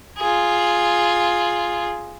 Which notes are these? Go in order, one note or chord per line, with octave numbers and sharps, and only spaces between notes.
F4 G#4